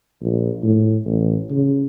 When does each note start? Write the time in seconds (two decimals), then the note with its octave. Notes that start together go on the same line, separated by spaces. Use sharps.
0.22 A#1
0.63 A2
1.06 A1
1.50 C#3